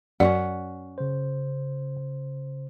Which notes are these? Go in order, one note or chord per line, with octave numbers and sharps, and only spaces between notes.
F#2 C#4 F4 D5 F#5
C#3 C5